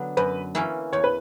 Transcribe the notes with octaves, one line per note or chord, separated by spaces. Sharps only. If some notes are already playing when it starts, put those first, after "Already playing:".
Already playing: D3 F#3 B3 D4
F#2 B4
E3 A#3 C#4 E4
E2 C#5
B4